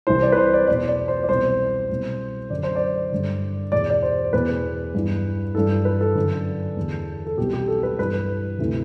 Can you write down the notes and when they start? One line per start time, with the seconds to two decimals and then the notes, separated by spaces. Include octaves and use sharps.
0.07 C2 C3 E3 C5
0.22 D5
0.32 B4
0.37 C5
0.53 D5
0.67 E2 B2 D5
0.88 D5
1.08 C5
1.23 D5
1.29 C2 B2 C5
1.90 C2 B2
2.50 F#2 D3 D5
2.63 C5
2.76 D5
3.12 G2 D3
3.72 E2 B2 D5
3.90 D5
4.03 C5
4.33 E2 B2 B4
4.94 G2 E3
5.55 G2 E3 A4
5.85 B4
6.01 A4
6.15 F#2 D3
6.77 E2 D3
7.26 A4
7.37 C2 B2 G4
7.53 G4
7.68 A4
7.83 B4
7.99 G2 E3 B4
8.59 D2 C3 E3